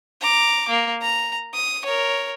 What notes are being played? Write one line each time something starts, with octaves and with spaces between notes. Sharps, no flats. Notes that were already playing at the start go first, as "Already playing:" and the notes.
A#5 D6
A#3
A#5
D#6
A#4 C#5